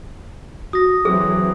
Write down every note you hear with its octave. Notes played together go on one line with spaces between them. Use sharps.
F#4 D#6 A#6
E3 F#3 C4 G#4